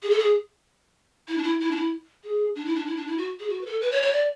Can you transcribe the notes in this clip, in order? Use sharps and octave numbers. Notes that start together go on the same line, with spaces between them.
G#4
A4
G#4
E4
D4
E4
E4
D4
E4
G#4
D4
E4
D4
E4
D4
E4
F#4
G#4
F#4
B4
A4
B4
C#5
C#5
D5